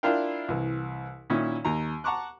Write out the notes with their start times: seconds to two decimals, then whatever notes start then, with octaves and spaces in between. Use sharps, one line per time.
0.03 D4 E4 F4 A#4 F5 G5
0.48 C2 E3
1.30 A#2 D#3 C#4 E4
1.65 D#2 A#5
2.04 F#5 A5 A#5 C#6 D6 F#6